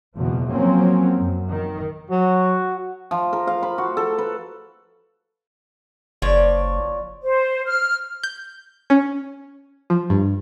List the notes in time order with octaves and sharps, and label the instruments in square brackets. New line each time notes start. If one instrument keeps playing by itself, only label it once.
[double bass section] F#1 E2 B2 F3
F3 F#3 A#3 C4 C#4
F#2
D#3
[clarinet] F#3 [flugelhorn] F#4
[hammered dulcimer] F3
A#4
F5
B5
F#4
A4
B4
[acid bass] F#1 [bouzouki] F3 C#5 D5
[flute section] C5
F6
[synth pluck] G6
C#4
F3
G2